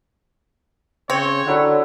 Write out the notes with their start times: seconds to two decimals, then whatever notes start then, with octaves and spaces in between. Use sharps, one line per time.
1.10 C#3 C4 C#5
1.46 D3 F#3 E4 F#5